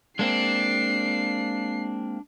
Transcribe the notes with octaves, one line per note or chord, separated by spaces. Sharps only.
G#3 A#3 C4 D4 C7